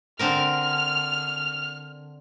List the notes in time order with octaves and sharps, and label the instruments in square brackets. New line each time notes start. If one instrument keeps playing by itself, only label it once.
[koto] D3 C4 A#4 [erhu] F6